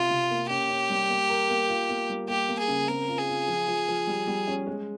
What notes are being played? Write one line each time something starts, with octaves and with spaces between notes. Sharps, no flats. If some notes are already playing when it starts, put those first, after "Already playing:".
Already playing: C3 F4
C3
A#3
C#4 G4
C#4
G3
A#3
A#4
A#3
F4
A#3
G3
A#3 G4
A#3
G#4
C#3
C4 A#4
F4
G#4
F4
F3
F3
F3
G3
G3
C#4
G#3